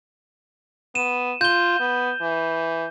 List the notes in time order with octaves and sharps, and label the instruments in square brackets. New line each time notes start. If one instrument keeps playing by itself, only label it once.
[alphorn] B3 [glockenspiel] D#7 E7
[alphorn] F4 [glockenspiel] G6 G7
[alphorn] B3
E3